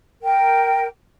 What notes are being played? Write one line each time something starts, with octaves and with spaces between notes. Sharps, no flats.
A#4 G5